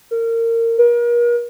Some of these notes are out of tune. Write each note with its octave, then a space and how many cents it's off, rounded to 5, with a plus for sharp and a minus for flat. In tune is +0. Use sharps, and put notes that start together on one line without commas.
A#4 -25
A#4 +40